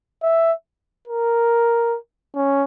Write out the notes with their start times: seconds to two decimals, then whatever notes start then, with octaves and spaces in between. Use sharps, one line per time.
0.22 E5
1.08 A#4
2.35 C#4